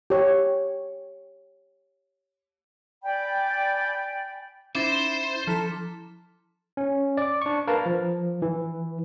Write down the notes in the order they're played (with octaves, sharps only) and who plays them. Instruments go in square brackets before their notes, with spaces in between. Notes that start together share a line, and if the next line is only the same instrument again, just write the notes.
[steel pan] G4 C#5
[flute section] D5 G5 G#5 B5
[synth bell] C#4 D#4 [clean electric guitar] E4 [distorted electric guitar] C5 [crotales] D6 A6 E7
[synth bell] F3 E4 A#5 [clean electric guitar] A4
[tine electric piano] C#4
D5 D6
D4 C#6
A#4 B4 F5 A5
F3
E3